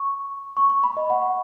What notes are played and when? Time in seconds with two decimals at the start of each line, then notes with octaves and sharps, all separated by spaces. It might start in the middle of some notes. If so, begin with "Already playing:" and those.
Already playing: C#6
0.57 C#6
0.70 C#6
0.83 B5
0.97 D#5
1.10 F#5